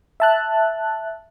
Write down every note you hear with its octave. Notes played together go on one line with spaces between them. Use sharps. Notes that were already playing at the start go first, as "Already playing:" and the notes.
E5 A5 F#6